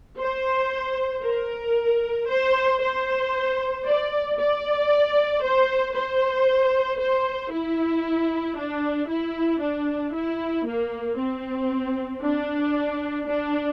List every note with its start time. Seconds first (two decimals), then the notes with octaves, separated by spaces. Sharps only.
0.19 C5
1.24 A#4
2.29 C5
2.81 C5
3.86 D5
4.38 D5
5.43 C5
5.95 C5
6.99 C5
7.52 E4
8.57 D4
9.09 E4
9.62 D4
10.14 E4
10.66 A#3
11.18 C4
12.23 D4
13.28 D4